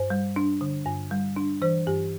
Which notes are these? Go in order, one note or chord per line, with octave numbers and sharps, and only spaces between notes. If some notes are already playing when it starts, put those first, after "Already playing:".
Already playing: G2 C5
G3
D4
D3
G2
G3
D4
E3 C5
G2 G4